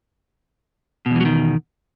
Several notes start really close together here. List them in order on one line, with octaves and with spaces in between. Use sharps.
B2 E2 E3 F#3 D#3